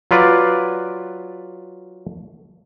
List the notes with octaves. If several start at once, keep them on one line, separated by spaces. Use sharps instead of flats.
F#3 F4 B4 D5